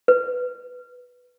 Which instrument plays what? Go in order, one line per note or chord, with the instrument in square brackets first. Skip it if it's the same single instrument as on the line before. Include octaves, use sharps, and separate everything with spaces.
[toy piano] B4